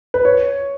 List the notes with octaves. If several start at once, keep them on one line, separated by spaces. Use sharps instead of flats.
B4
C#5